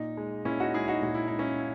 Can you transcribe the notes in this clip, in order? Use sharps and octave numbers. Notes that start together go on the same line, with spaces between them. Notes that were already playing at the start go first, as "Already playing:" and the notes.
Already playing: A#2 D#4
G#3
A#2 C#4 E4
D#4 F#4
G#3 E4 G#4
D#4 F#4
A#2 F#4
E4
G#3 D#4
C#4 E4
E4